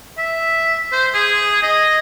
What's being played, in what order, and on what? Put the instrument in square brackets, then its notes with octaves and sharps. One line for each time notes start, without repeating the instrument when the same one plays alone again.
[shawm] E5
C5
G#4
D#5